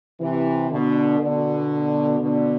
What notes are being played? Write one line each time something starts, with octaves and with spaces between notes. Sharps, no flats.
C3 E3
B2 D3
B2 D3
B2 D3